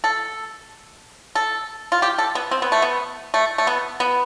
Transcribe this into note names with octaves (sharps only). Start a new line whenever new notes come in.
A4
A4
F4
G4
A4
B3
C4
B3
A3
B3
A3
A3
B3
B3